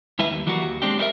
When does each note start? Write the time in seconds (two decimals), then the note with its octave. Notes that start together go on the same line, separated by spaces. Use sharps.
0.19 D2 G3 E4 B4 E5
0.32 D#2
0.47 E3 F#3 G3 A#3 F#4
0.64 D#2
0.82 G#3 C4 D4 G4
0.98 G3 D#4 G4 A#4 E5